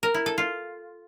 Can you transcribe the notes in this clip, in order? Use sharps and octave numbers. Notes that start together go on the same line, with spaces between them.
A#4
E4
A4
F4